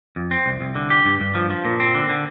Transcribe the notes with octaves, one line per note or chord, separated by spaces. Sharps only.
F2
C4
C2
C2
D3
G4
G2
G2
F3
F3
A#2
C4
D3
D3